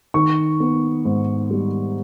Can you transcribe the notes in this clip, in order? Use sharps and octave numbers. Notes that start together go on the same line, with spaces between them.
D#3 C#6
B3
G#2
G3